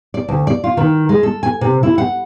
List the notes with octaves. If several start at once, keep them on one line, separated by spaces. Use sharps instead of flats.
D5
D2
D5
F4
D#3
G#3
A4
G#5
C3
E4
F#5